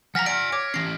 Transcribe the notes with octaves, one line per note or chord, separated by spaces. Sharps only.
F3 F#5 G#5 A#5 F6 A#6 B6
D5 G#5 F6 D7
C#5 D6
E3 C#4 A#6 C7